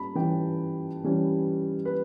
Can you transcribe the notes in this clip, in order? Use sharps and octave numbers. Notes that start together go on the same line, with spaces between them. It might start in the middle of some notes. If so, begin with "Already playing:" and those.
Already playing: G3 C#4 A5 B5
E3 G3 C#4 G5
E3 G3 C#4
B4